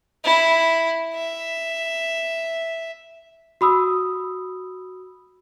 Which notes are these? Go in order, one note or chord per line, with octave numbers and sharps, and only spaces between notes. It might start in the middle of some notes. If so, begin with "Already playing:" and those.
E4
E5
F#4 B5 D#6 E6